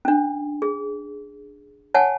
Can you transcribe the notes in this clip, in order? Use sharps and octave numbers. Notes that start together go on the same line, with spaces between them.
C#4 D4
G#4
C#5 F#5 G#5 A5